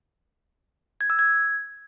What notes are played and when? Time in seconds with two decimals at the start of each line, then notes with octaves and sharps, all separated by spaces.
1.01 G#6
1.10 E6
1.19 G#6